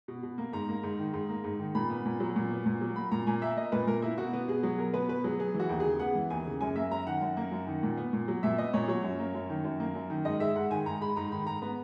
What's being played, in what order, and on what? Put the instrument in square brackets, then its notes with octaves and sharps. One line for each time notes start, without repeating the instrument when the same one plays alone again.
[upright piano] B2
B2
A#3
G#2 A#5
A#3
G#2
D#3
G#2
A#3
G#2
D#3
A#2 B5
B3
A#2
F#3
A#2
B3
A#2
F#3
A#3 B5
A#2 A#5
A#2 G#5
A#3 E5
A#3 D#5
A#2 B4
A#2 A#4
A#3 E4
B2 F#4
B3
B2 G#4
F#3
B2 A#4
B3 B4
B2 B4
F#3 G#4
B3 G#4
E3
F#4
D#2
C#3 G#4
B3 F#5
E3
D#2 G#5
C#3
F#2 G#5
A#3 E5
F#2 A#5
D#3 F#5
F#2
A#3
F#2
D#3
A#2
B3
A#2
F#3
A#2 E5
B3 D#5
A#2 C#5
F#3 C#5
F#2
A#3
F#2
D#3
F#2
A#3
F#2
D#3
G#2 D#5
G#3 E5
G#2 F#5
D#3 G#5
G#2 A#5
G#3 B5
G#2 A#5
D#3 B5
G#2 A#5
B3 A#5